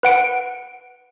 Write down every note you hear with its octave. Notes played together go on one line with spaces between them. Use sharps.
B4 F#5 D7